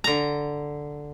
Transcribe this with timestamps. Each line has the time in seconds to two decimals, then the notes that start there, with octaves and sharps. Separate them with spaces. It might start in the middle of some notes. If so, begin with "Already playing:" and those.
0.04 D3 A#5